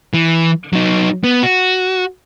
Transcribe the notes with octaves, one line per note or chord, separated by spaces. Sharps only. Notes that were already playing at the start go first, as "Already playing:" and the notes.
E3
F#3 D#4
B3
F#4